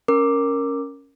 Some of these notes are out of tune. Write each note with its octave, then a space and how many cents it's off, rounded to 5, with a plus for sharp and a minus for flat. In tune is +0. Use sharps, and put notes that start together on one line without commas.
C#4 +0 A#4 +0 D6 +0